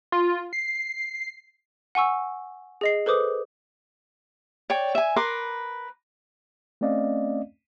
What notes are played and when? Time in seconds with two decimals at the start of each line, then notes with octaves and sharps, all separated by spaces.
0.12 F4
0.53 C7
1.95 F#5 G#5 C#6 E6
2.81 G#4 D#5 C7
3.06 A4 B4 C5 D6 D#6
4.70 C#5 D5 G5
4.95 E5 G#5
5.16 A#4 B4 C6 D6
6.81 A3 C4 C#4 D5 D#5 F5